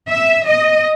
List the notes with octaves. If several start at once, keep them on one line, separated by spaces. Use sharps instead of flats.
E5
D#5